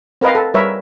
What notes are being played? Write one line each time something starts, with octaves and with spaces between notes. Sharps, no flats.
C4 A#4 B4 D#5 F5
A4
G3 A#4 B4 C#5 E5